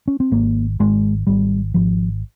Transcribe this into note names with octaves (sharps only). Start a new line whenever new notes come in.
C#4
C4
G#1 A#3
G#1 G#3
G#1 G3
G#1 F3